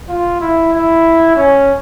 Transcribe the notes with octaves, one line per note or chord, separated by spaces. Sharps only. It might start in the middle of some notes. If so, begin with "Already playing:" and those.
F4
E4
E4
C#4